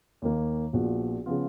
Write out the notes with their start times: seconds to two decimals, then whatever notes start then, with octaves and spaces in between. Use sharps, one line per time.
0.22 D#2 D#3 A#3
0.73 A#1 A#2 F3 B3 F#4
1.26 C#3 F3 B3 F4